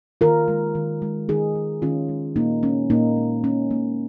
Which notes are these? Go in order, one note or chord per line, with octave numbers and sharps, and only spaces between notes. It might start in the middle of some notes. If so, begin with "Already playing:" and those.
D#3 F4 A#4
G#3
D#3
G#3
D#3 D#4 G#4
G#3
D#3 C#4 F4
G#3
A#2 A#3 D#4
G#3 C#4
A#2 A#3 D#4
G#3
A#2 C#4
G#3 A#3